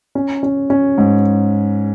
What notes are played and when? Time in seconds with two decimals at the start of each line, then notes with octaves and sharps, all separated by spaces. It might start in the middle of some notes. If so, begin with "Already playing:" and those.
0.15 C#4
0.43 C#4
0.70 C#4
0.98 G#2